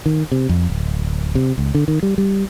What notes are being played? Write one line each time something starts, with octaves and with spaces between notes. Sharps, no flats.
D#3
C3
F2
D1
C3
C#2
D3
D#3
G3
G3